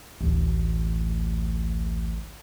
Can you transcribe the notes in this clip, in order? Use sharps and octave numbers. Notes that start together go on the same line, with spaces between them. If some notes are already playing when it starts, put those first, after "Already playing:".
A1 D2